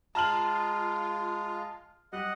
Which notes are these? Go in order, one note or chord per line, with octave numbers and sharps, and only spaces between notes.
G#3 F4 A5 A#5 F6 F#7
G3 D#5 F#5